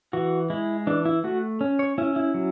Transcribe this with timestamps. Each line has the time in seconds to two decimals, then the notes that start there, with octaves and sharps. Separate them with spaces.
0.13 E3 F#4
0.50 G#3 E4
0.87 E3 D4
1.05 E4
1.24 A3 F#4
1.61 C#4
1.79 C#5
1.98 C#4 E4
2.16 E4
2.34 F#3